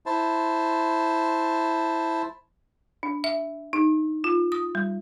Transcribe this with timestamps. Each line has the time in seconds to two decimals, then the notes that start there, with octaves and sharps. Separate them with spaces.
0.06 E4 C5 A5
3.03 D4
3.24 E5
3.73 D#4
4.24 F4
4.52 D#6
4.75 G3